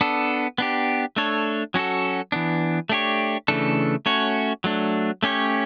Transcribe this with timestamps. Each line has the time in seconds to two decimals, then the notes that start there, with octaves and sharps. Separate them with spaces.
0.01 B3 D4 A4
0.58 B3 D4 G4
1.16 A3 D4 A4 C#5
1.74 F#3 C#4 F#4 A4
2.32 E3 B3 D4
2.89 A3 D4 G4 C#5
3.48 C#3 E3 A3 D4 A4
4.06 A3 C#4 F#4 C#5
4.64 F#3 A3 D4
5.23 A3 C#4 G4 C#5